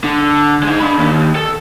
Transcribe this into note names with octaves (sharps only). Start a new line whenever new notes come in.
D3
G#3 D#4
D4 B5
D#2
A4